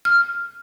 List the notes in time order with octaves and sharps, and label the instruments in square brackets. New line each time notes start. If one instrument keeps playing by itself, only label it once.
[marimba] F6